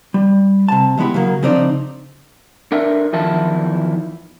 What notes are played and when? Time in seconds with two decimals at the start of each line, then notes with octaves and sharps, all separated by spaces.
0.14 G3
0.68 C3 A5
0.98 E3 G#3 B3 E4 G4
1.14 C#3 F#3 A#3
1.43 C#3 F3 C4 D4 D#4 D5
2.72 D4 A4 A#4 E5
3.13 E2 D#3 F3 E4 A5